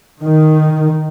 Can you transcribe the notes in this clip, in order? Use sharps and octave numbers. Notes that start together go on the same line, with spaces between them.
D#3